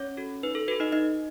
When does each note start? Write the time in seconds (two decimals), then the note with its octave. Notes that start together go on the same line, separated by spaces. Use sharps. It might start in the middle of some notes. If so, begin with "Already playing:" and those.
Already playing: C#4 C#5
0.17 F#4 A4
0.43 D#4 B4
0.55 A4
0.68 F#4 A4 B4
0.80 D#4 D#5
0.92 D#4 D#5